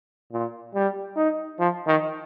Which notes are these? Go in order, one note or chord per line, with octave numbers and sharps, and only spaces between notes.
A#2
G3
D#4
F3
D#3